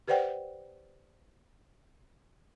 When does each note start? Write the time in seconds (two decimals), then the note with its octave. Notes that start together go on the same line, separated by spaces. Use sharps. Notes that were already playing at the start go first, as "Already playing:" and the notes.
0.08 G4 B4 C5 D5 F#5 G5